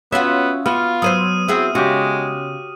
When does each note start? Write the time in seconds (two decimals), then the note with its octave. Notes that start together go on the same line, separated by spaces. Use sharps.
0.12 B3 C#4 F4 F#4 E5
0.66 B3 F4 F#4 F6
1.02 F#3 B4 C5 D#6 D#7
1.48 C4 E4 F#4 G#4
1.75 C#3 G#3 F#4 G4